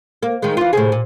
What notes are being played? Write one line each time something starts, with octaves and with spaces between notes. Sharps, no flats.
A#3
D#3 G#3
E3 F4
A2 C3 G#4
A#2